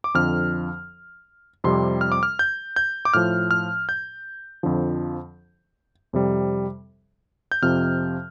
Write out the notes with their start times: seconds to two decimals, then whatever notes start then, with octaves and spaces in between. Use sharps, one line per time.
0.04 D6
0.14 F2 D3 F3 F6
1.64 F2 C3 G3 C6
2.01 F6
2.12 D6
2.23 F6
2.39 G6
2.76 G6
3.05 D6
3.14 A2 F3 F6
3.51 F6
3.89 G6
4.63 F2 D3 F3
6.13 F2 C3 G3
7.52 G6
7.62 F2 C3 F3 F6